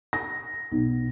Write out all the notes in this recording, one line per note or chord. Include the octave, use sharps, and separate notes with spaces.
A#6
B1